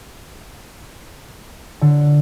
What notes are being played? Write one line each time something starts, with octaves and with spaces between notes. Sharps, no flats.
D3